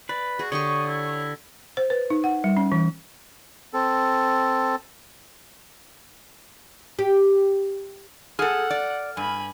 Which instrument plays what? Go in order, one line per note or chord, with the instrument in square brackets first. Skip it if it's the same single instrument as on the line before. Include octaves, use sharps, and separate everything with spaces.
[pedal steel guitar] B4 [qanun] D5
[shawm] F#4 [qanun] G#4
[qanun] D3 G4 C#6 [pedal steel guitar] C#5 [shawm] D#6
[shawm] E4
[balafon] C5
B4
D#4
F#5
G3
C#4
E3
[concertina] C4 A4
[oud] G4
[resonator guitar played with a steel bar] G#4 A4 [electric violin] F#5 [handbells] F6
[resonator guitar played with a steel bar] D5
[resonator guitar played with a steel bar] G2 [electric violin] G#5 B5